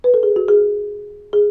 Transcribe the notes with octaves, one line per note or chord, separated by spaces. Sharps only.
B4
A4
G#4
F#4
G#4
G#4